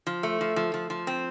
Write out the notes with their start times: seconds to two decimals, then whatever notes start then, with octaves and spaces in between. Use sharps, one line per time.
0.07 F3
0.23 A3
0.41 F3
0.56 F3
0.74 F3
0.90 F3
1.07 C4